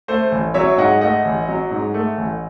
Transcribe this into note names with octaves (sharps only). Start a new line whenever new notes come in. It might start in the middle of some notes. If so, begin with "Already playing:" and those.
A3 C5
A1
F#3 C#5 E5
G#2 D#5 F#5
A3 D#5 F#5
A1
F#3
G#2
A3
A1